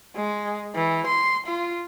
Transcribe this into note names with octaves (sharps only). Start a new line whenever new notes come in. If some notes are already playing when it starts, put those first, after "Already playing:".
G#3
E3
C6
F4